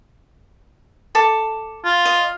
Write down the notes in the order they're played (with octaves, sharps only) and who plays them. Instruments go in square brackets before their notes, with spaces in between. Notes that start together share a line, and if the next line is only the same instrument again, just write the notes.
[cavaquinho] A4 A5 D6
[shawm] F4
[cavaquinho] D#5